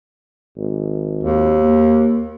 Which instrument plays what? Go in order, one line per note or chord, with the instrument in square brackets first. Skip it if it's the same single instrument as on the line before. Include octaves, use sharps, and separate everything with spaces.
[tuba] G#1
[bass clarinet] D#2
[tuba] A#3